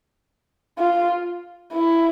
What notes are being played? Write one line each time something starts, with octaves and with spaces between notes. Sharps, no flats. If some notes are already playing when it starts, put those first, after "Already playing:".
F4
E4